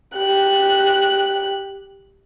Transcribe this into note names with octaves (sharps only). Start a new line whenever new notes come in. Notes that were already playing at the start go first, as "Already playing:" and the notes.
G4 F#6